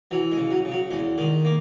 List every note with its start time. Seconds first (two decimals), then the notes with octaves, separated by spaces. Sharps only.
0.11 E3 F#3
0.32 G#3
0.38 C#3
0.51 F#3
0.65 C#3
0.72 F#3
0.91 E2 G#3
1.18 D#3 G#3
1.45 A#3